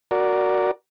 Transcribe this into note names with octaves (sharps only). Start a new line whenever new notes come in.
F#4 A#4 D5